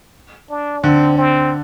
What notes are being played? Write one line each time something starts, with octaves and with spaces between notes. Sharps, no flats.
D4
D3 C4
C4